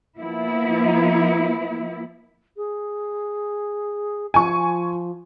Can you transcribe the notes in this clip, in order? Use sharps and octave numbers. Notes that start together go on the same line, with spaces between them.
F3 A#3 B3 E4
G#4
F3 G#5 C#6